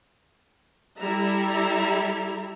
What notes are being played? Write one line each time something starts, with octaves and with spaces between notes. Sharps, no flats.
G3 E4 G4 A4 E5 A#5